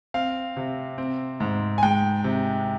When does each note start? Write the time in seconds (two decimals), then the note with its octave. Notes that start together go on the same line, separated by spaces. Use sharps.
0.14 C4 F5
0.57 C3
0.98 C4
1.40 G#2
1.78 G#5
1.83 G#3 G5
2.24 C3